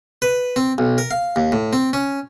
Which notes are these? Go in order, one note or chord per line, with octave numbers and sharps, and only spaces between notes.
B4
C4
B1
A#4
F5
D#2
A2
C4
C#4